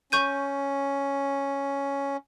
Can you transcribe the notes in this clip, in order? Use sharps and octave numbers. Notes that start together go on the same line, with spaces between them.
C#4 C#6 G6 D#7